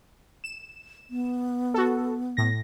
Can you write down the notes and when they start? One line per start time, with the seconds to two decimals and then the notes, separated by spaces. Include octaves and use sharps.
0.44 E7
1.10 B3
1.74 F#4 A4
2.37 A2 A#6